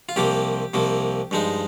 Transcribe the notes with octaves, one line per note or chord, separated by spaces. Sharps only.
F4
C2 C3 F3 A#3 G4
C2 C3 F3 A#3
G2 F3 G#3 D#4